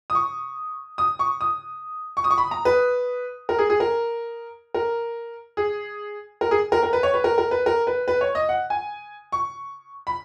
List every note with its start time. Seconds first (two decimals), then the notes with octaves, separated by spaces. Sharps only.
0.10 D#6
0.15 C#6
0.98 D#6
1.19 C#6
1.41 D#6
2.17 C#6
2.24 D#6
2.31 C#6
2.38 B5
2.51 A#5
2.65 B4
3.49 A#4
3.59 G#4
3.70 G#4
3.80 A#4
4.74 A#4
5.57 G#4
6.41 A#4
6.51 G#4
6.72 A#4
6.83 A#4
6.93 B4
7.03 C#5
7.14 B4
7.24 A#4
7.38 A#4
7.51 B4
7.66 A#4
7.87 B4
8.08 B4
8.21 C#5
8.35 D#5
8.49 F#5
8.70 G#5
9.32 C#6
10.07 B5